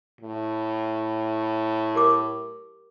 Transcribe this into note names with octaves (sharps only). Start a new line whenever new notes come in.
A2
G4 A#4 D6